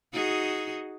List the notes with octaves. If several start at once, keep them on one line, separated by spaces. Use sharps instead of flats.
D#4 F#4 G#4